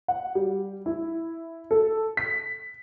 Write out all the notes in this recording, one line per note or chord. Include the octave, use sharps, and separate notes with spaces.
F#5
G3
E4
A4
B6